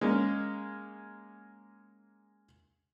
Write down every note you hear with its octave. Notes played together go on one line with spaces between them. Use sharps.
G#3 A#3 C#4